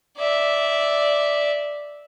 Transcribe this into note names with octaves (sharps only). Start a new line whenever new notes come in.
D5 E5